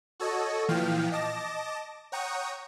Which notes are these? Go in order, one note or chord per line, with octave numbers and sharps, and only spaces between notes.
F#4 A4 C#5 D#5
A#2 E3 F3 F5 G5 F6
D#5 A5 D6 A#6 E7
C#5 F#5 G5 A#5 C#6 D#6